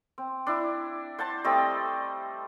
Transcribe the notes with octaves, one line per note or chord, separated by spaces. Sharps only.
C4
D4 E4
C5 F#5 A5
G3 A3 C4 D#5